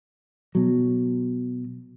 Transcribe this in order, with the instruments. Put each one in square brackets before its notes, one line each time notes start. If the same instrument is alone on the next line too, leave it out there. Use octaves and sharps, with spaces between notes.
[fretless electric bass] B2 F#3